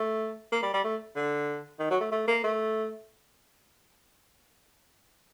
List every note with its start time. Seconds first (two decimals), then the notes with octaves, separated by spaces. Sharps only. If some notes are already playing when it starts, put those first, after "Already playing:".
Already playing: A3
0.52 A#3
0.63 G3
0.73 G3
0.84 A3
1.16 D3
1.79 D#3
1.90 F#3
2.01 A3
2.12 A3
2.28 A#3
2.44 A3